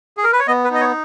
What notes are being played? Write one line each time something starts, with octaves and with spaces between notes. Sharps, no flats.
G#4
A#4
B4
C#5
B3 D#5
B4
D#4 D#5
C#5